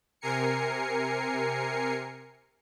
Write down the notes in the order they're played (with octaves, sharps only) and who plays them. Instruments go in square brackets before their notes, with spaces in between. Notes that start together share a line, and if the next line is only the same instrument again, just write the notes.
[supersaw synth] C3 A#4 G#5 C7 C#7